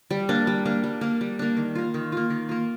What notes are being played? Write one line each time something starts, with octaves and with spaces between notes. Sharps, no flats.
G3
A#3 D4
G3
A#3 D4
G3
A#3 D4
G3
A#3 D4
D#3
A#3 F4
D#3
A#3 F4
D#3
A#3 F4